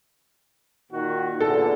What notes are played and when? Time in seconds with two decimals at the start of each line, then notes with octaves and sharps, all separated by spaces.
0.92 A#2 D#3 F#4
1.40 E2 A#2 D3 A4